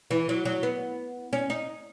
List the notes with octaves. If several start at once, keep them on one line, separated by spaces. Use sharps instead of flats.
E3
F#3
F#3
B3
C#4
D#4